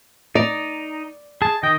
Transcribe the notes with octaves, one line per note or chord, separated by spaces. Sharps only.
D#4 D5 A#5
G#4 A5
D#3 D#5 G5